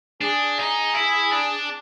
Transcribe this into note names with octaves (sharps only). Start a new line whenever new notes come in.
D4 G#4
D#4
E4
D4